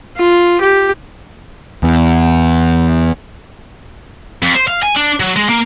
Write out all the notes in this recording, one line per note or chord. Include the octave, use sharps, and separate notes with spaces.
F4
G4
E2
F2
C5
F5
G#5
D4
F#3
G#3
A#3